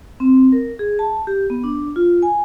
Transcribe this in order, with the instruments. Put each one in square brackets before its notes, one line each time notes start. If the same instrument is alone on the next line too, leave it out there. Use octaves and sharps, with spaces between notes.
[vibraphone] C4
A#4
G#4
A5
G4
B3
D4
F4
G#5